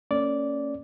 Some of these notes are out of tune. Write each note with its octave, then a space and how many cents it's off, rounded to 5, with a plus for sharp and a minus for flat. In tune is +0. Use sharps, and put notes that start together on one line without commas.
A#3 -30 C#4 +0 D5 -10